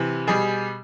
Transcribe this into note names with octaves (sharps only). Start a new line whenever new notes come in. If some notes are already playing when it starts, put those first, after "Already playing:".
Already playing: C3 E3
B2 G3 G#4